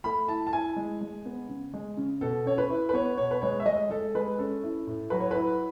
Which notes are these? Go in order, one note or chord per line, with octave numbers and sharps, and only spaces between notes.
A3 B5
E4 A5
A5
E4 G#5
G#3
G#3
B3
C#3
G#3
C#3
B2 A4
C#4 C#5
B4
E4
B4
B3 C#5
B2 C#5
B4
G#3 C#5
E5
G#3 D#5
G#3 A4
G#3 B4
C#4 A4
E4
A2
F#3 B4
C#5
E4 B4